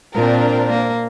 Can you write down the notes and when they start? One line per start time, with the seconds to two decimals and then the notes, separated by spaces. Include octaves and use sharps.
0.15 A#2 C4 D4 A#4
0.70 A#3